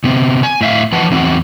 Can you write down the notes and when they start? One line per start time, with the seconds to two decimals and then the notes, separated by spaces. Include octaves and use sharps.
0.04 C3 B3 C4
0.43 G#5
0.61 A2 E5 F5
0.92 E3 F3 B4 F#5 A5
1.11 E2 C4 D#4 F#4